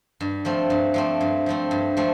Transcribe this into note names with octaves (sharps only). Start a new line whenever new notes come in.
G2
F3 A3 C4
G2
F3 A3 C4
G2
F3 A3 C4
G2
F3 A3 C4